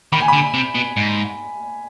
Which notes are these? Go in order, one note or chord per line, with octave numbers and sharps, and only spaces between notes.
D#3 B5
G#5
D3 B5
C3
B2
G#2